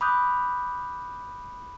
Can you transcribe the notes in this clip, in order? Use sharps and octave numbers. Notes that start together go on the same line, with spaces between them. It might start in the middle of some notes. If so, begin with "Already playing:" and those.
B5 D6 D#6 F#6 G6